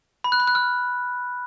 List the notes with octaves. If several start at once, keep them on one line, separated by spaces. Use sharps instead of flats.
B5
F#6
B5
F#6
F6